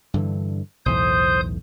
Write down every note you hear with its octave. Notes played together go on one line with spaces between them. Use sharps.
G2 D3 E3
B1 E2 A2 C5 D#6 G6